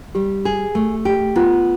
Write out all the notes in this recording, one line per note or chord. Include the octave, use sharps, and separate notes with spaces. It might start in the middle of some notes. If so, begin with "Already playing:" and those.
G3 G4
G#4
A3
G4
B3 F4